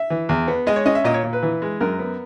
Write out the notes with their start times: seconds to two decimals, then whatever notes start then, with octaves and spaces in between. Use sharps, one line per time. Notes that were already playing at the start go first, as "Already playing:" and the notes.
Already playing: E5
0.10 E3
0.29 E2
0.48 B3
0.67 G#3 D#5
0.76 C#5
0.86 C#4 D#5
0.95 E5
1.04 A#2 D#5
1.14 C#5
1.23 A#2
1.33 B4
1.42 E3
1.62 G#3
1.81 F#2 A#4
1.99 B3